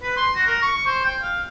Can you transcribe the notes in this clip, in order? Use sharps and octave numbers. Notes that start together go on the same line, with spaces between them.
B4
C6
F#4
A#4
C#6
C5
G5
F5